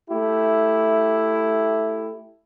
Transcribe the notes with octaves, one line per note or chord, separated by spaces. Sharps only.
A3 E4 G4